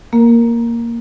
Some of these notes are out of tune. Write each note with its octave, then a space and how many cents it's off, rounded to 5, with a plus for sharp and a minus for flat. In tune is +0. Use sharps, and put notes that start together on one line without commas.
A#3 +0 A#4 +0